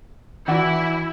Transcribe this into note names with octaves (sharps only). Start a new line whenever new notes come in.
E3 E4 F#4 D5